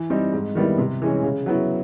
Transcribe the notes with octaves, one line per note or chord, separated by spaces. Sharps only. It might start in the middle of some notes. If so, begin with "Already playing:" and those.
Already playing: E3
G3 C4 D#4
G#2
D#3 G3 B3 E4
C3
E3 G#3 C#4
C#3
F#3 B3 E4